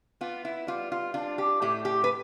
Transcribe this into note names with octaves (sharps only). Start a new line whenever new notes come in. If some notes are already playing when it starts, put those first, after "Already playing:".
B3 F4
E4
G3 F4
F4
D4 F4
G4
A2 G4
G4
B4